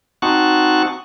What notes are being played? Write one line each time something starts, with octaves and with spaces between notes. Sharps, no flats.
C4 D#4 F#4 F#5 A5 C#6